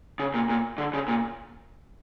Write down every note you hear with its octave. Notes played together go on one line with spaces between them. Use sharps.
C#3
A#2
A#2
D3
C#3
A#2